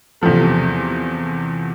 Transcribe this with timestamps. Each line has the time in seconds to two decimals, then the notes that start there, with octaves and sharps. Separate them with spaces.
0.22 E2 C3 F3 A3